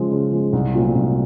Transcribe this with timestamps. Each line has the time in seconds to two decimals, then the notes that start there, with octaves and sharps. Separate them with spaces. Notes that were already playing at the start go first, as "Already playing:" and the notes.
Already playing: C#3 F3 G#3
0.11 C#3
0.32 F3 G#3
0.53 C2
0.74 A#2 F#3 A3 C4
0.95 C2